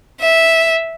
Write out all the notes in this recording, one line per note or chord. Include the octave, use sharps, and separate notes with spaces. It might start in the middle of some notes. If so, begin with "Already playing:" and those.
E5